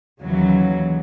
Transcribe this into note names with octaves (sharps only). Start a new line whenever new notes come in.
D#2 C#3 E3 F#3